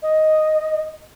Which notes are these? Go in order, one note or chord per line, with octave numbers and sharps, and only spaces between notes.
D#5